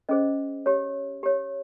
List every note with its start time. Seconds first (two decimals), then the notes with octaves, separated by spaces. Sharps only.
0.09 C#4 G#4 C5 D#5
0.66 G4 C#5
1.23 G4 C#5